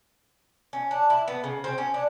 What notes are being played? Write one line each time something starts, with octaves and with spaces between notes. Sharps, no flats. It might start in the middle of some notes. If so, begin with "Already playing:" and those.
C#4
D4
E4
B3
C#3
C4
C#4
D4